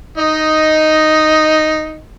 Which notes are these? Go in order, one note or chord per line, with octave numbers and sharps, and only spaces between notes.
D#4 D#5